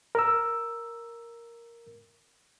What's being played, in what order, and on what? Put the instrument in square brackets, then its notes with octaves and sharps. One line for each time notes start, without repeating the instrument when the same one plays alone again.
[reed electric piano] A#4 E6